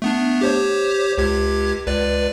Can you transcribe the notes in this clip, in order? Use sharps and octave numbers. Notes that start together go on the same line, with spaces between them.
A3 B3 D4
G4 C5 C#5
C#2 G4 G#6
C#2 B4 D5